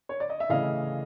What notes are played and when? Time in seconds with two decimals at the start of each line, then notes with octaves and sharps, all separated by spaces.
0.09 C#5
0.20 D5
0.30 D#5
0.40 E5
0.50 C#3 E3 A3 C#4 E4 D#5 F5